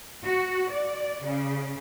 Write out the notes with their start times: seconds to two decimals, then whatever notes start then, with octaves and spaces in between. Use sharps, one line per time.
0.24 F#4
0.70 D5
1.23 C#3